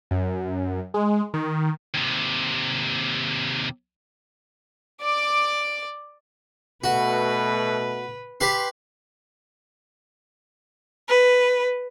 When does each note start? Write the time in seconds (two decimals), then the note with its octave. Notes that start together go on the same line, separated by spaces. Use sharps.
0.11 F#2
0.94 G#3
1.34 D#3
1.94 D#2 C3
5.02 D5 D6
6.84 B2 A3 F#4 B4
8.41 G4 B4 C6
11.09 B4